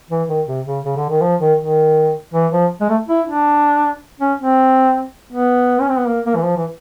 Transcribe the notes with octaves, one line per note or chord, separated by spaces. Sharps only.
E3
D#3
C3
C#3
C#3
D3
D#3
F3
D#3
D#3
E3
F3
G#3
A3
E4
D4
C#4
C4
B3
C#4
C4
B3
A#3
A#3
E3
F3
E3